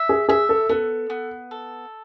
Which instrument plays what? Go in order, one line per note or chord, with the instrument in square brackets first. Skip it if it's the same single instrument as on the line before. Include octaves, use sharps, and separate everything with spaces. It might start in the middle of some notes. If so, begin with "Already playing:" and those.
Already playing: [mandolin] E5
[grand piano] G#4
[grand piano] G#4 [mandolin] E5
[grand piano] A4
[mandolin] B3 [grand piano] A4
[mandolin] B3
A4